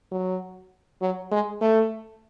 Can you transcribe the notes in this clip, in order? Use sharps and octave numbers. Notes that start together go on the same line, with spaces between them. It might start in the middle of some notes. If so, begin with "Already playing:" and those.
F#3
F#3
G#3
A3